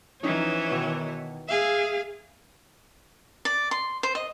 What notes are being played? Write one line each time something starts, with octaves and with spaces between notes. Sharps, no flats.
E3 F3 C#4 D#4 C#5
B2 D#3
G#4 E5 F5 G#5
D5
C6
C5
D#5